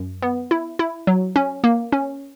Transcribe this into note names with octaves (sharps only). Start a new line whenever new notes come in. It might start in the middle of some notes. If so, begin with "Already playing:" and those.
Already playing: F#2
B3
E4
E4
F#3
C#4
A#3
C#4